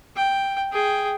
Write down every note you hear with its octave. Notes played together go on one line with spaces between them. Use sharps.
G5
G#4 G5